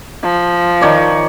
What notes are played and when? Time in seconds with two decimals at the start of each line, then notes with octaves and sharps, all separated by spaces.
0.23 F3
0.81 D#3 C#5 D5